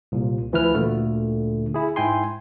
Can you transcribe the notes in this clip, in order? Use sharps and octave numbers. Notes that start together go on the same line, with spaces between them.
C2 A#2
D2 E3 F3 E4 B4 F6
D2 A#2 D3 A3
E4 G#4
G#2 E4 G5 G#5 C6